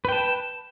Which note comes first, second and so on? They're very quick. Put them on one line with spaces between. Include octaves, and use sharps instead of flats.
B4 G5 A5